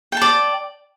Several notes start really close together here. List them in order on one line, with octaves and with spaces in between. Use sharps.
G5 A5 D5